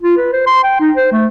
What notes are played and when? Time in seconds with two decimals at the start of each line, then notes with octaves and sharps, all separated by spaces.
0.03 F4
0.17 B4
0.32 C5
0.46 C6
0.63 G5
0.80 D#4
0.96 C5
1.12 A3